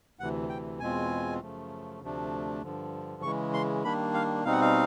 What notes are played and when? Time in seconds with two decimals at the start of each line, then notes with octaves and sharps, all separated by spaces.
0.19 D2 C3 E3 F#5
0.49 G5
0.80 E2 B2 G#3 C4 F4 G#5
1.41 F#2 C#3 F3 A3
2.01 D2 C3 F3 A3 D4
2.63 G2 D3 F3
3.22 C#3 E3 G#3 C#6
3.53 C6
3.84 D#3 G3 A#3 D4 B5
4.14 F5
4.44 B2 G3 C4 D#4 F5
4.52 F#5
4.61 F5